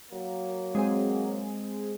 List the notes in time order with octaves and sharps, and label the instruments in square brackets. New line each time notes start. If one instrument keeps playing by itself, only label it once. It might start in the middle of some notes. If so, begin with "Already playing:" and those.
[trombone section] F#3 A#3
[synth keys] G#3 C4 G#4